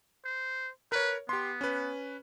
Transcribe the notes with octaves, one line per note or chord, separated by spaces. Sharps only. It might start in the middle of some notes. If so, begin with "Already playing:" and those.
C5
A#4 B4 C#5
B3 G4 C6
C#4 B4